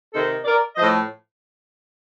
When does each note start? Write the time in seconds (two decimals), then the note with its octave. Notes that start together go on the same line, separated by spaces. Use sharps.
0.13 C3 D#3 A4 C5
0.45 A#4 D5
0.76 A2 F3 C5 D#5